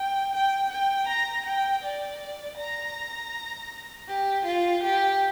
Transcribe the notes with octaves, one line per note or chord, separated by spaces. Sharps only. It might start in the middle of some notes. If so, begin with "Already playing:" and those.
Already playing: G5
G5
G5
A#5
G5
D5
A#5
G4
F4
G4